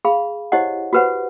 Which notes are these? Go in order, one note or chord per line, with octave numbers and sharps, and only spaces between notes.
G#4 F5 B5
E4 G4 C5 C#5 D#5 F#5
F#4 G4 B4 C5 F#5